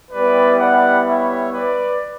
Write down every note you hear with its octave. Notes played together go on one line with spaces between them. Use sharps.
G3 B3 E4 G4 B4 D5
D5 F#5
C#5 E5
B4 D5